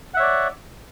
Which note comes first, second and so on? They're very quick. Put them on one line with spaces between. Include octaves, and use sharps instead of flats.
F#5 E5 C#5 D5